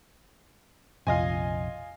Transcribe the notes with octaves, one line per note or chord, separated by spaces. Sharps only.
A#1 F2 C3 F4 D#5 G#5